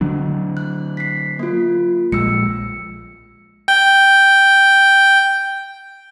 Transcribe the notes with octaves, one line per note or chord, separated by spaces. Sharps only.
D3 F#3 D4
F#6
B6 C7
A#3 F4
A#1 G#3 E6 C#7
G5 G6